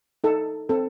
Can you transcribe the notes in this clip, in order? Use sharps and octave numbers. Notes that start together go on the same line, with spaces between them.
D#4 A4
C4 A4